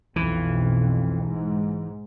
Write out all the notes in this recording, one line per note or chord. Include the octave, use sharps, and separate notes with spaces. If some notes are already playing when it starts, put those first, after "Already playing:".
B1 F2 E3
G#2